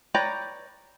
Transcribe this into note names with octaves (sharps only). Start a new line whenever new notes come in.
B4 C#5 D5 G5 A#5